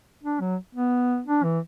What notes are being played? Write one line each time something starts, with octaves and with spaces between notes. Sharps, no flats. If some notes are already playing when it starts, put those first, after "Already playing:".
D4
F#3
B3
D4
E3